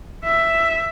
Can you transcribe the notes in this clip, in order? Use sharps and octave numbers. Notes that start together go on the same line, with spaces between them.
E5